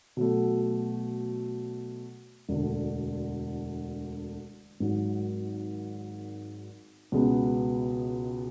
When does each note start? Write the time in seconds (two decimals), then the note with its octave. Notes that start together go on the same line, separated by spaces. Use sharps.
0.17 B2 F#3 A3
2.49 E1 D2 D3
4.80 G#1 G#2 F#3
7.12 C#2 B2 G#3 B3